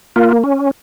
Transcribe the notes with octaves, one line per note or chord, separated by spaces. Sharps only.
A#3 F4
C#4